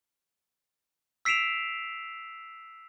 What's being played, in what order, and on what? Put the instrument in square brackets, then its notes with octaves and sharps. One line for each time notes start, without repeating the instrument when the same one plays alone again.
[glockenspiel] E6 B6 C7 D7 E7 F7